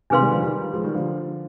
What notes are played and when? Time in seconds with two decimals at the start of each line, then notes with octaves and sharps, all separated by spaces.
0.10 C3 D#3 D4 G#4 B4 F5 C6
0.21 D#3 G3
0.31 D3 F3
0.42 D#3 G3
0.73 F3 G#3
0.84 D#3 G3
0.94 D3 F3